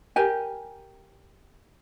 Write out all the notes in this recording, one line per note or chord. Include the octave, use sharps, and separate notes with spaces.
G4 A#4 G#5